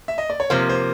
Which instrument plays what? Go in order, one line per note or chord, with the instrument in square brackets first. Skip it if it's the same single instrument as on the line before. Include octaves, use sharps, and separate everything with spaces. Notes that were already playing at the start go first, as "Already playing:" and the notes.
[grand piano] E5
D#5
D5
C#5
[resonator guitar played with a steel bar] C3 F3 A#3 [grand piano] C5
[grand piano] C5